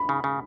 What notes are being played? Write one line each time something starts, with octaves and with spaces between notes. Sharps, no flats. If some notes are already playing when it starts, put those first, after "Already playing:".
Already playing: B5
C#3
C#3